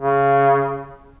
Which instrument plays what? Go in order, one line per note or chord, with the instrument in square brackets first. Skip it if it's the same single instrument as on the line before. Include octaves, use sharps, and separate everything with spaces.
[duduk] C#3